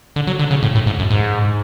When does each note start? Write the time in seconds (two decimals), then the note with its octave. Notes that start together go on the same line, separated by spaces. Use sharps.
0.16 D3
0.27 F#3
0.39 D3
0.51 C#3
0.63 A2
0.75 A2
0.86 G#2
0.99 F#2
1.10 G#2